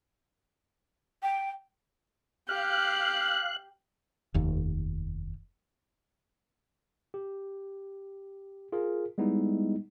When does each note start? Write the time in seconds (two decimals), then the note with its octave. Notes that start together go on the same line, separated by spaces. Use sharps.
1.23 G5
2.49 G4 F5 F#6
4.34 F1 D#2
7.14 G4
8.72 F4 G#4 A#4
9.18 G3 G#3 B3 D#4 E4